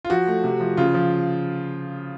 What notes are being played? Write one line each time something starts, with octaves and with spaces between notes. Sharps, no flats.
F4
F3 F#4
A3
C3
F3
C#3 F4
F3